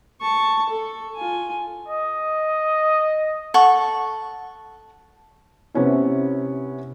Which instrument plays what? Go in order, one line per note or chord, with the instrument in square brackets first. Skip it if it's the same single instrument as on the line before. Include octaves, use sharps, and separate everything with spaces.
[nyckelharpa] A5 C#6
A4
F4 G#5
[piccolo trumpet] D#5
[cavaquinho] A4 F#5 C#6
[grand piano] C3 B3 C#4 E4